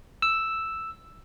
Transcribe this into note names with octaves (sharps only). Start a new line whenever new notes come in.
E6